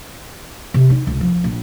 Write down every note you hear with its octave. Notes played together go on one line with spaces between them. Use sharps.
C3
D#4
C#2
F3
A#1